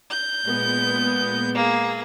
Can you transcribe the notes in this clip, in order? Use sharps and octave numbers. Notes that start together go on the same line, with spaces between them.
G6
A#2 G#3 B3
A#3 G#4